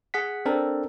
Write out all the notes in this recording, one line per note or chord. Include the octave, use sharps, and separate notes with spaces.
G#4 F#5 B6
C4 D4 A4 A#4